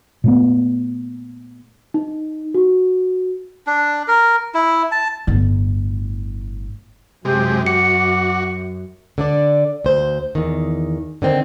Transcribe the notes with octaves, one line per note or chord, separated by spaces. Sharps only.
A#2 A3 B3
D#4
F#4
D4
A#4
E4
A5
G1 A2
F#2 C3 G#3 G4
F#4 D6 C#7
D3 D4 D5
D2 C5
E2 D#3
D3 D#3 C4